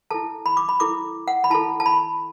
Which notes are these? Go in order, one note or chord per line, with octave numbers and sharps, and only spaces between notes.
E4 A4 A5
B5
D6
B5
E4 A4 D6
F#5
B5
E4 A4 A5
A5
B5